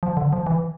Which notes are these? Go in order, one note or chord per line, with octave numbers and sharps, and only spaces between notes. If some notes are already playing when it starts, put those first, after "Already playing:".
F3
D3
F3
E3